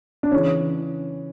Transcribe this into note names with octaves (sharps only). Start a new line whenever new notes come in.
D4
C#3 E3 C#4